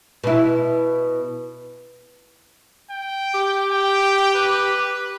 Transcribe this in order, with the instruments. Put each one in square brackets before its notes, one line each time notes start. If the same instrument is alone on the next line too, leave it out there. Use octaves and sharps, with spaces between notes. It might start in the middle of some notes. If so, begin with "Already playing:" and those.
[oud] B2 E4
[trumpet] G5
[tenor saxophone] G4
[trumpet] G5
B4